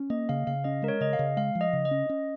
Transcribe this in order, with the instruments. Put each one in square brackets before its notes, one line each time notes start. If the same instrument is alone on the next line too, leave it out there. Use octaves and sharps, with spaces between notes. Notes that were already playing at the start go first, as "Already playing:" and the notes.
Already playing: [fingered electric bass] C#4
[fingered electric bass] A#3 [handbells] D#5
[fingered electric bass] C#3 [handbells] F5
[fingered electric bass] C#3 [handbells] F5
[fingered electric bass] C#4 [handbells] D#5
[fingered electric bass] G#3 [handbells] A#4
[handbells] C#5
[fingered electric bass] C#3 [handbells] D#5
[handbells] F5
[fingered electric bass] C#3
[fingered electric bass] G#3 [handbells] F5
[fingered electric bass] F3
[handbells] D#5
[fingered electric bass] C#3
[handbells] D#5
[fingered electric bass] C#4
C#4